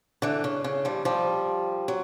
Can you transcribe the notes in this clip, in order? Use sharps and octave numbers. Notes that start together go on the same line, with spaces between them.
D3 E3
C#3
C#3
F3 G3
F3 G3
F#3